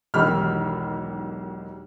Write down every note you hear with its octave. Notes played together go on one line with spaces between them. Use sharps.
E1 B1 D#3 G4 B5 F6